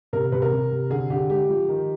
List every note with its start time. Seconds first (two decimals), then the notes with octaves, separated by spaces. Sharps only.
0.13 C3 A#4
0.32 C3 B4
0.42 A#4
0.52 C3
0.71 C3
0.90 D3 G#4
1.10 D3 G4
1.30 G#3 G4
1.49 F3
1.69 D#3